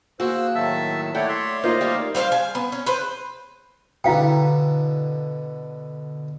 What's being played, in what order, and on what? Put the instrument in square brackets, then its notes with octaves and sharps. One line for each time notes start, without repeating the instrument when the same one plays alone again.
[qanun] A#3 G#4 [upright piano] F#4 [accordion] C5 E6 F#6
[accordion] A2 D#3 F#3 [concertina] E5 A5 E6
[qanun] A3 [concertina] E4 F#5 G5 [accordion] C#5 D5
[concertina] E5 C6
[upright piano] A#3 D#4 [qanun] F4 [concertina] C5 D#5 F5
[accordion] G3 D5 [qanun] G4 C#5
[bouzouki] G3 C5 D#5 F5
G#5
B3
C#4
B4 C5
[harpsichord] B2 D3 [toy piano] E4 F5 G5